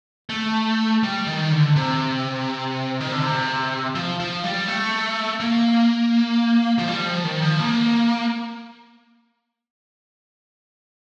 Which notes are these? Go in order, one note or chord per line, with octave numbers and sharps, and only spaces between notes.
A3
G3
D#3
D3
C3
D#3
D3
C3
F3
F3
G3
A3
A#3
F3
G3
F3
D#3
F3
A#3